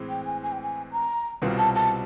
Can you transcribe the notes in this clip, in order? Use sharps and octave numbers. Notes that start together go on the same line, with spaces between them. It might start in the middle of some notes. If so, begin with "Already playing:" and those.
Already playing: A2 E3 G#3 C4
G5
G#5
G#5
G5
G#5
A#5
C2 B2 G3 C4 F4
A5
A5